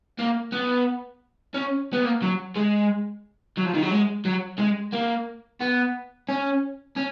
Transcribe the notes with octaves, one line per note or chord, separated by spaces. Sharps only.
A#3
B3
C#4
B3
A#3
F#3
G#3
F#3
F3
D#3
F#3
G#3
F#3
G#3
A#3
B3
C#4
C#4